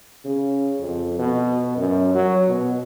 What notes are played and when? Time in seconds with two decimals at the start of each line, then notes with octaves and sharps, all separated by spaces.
0.25 C#3
0.80 F2
1.19 B2
1.77 F#2
2.15 F#3
2.48 B2